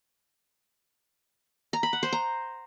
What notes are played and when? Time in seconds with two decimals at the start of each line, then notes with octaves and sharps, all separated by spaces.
1.73 A#5
1.83 B5
1.93 F#5
2.03 C5
2.13 A#5